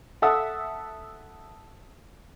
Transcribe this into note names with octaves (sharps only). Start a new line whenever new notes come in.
A4 E5 F#5 A5 D#6 E6